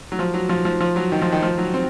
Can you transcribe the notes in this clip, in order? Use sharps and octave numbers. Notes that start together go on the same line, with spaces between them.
F#3
F3
F#3
F3
F3
F3
F#3
D#3
F3
D#3
F3
F#3
C4